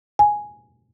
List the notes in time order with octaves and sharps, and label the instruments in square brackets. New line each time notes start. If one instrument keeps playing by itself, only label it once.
[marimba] G#5